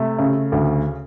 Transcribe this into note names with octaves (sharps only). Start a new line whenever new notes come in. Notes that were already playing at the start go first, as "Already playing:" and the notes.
Already playing: C3 A3
C#3
D2